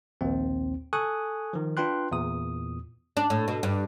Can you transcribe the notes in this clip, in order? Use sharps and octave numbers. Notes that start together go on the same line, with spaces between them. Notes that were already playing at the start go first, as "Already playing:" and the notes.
A#1 D#2 C4
A4 G#5 C#6 D#6 F#6
D#3 F3
D4 F4 B4 G5 C6 F#6
E2 A#2 D#6
D4
A2
B2
G2